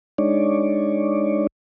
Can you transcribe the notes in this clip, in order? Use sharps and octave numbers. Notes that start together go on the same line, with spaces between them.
G#3 D4 D#4 C#5 D5